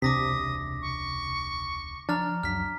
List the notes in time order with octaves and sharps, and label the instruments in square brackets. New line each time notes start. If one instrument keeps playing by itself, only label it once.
[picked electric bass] E1 C#2 D4 [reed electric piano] C3 [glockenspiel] D6 A#6 B6 [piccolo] D#6
[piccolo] C#6
[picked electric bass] F3 [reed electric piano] D4 [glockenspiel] A#5 F6 A6
[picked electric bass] C#2 F#2 F#3 [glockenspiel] F6 B6